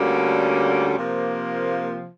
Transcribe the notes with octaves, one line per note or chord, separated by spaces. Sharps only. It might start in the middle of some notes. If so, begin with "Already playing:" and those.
Already playing: D2 D3 G3 A#3 C#4
C3 F3 A#3